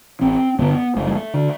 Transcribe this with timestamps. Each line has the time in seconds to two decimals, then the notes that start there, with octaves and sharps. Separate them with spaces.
0.21 A1 C4
0.59 G2 D3 B3
0.96 F#1 A3
1.06 G3
1.15 A3
1.34 D3